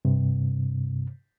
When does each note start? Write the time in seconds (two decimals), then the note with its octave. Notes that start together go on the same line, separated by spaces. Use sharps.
0.05 G2 C3